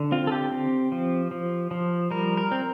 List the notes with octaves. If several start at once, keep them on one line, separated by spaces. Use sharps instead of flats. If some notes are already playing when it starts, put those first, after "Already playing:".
Already playing: D3
C4 F4
A4
G4
C4
F3
F3
F3
G3 A#4
A#4
C4